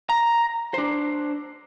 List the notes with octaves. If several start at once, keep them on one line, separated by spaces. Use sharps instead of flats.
A#5
D4 C5